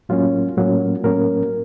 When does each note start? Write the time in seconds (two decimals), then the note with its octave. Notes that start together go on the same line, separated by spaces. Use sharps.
0.09 A2 F#3 A#3 C#4 F4
0.57 A2 F#3 A#3 C#4
1.04 A2 F#3 A#3 C#4 A#4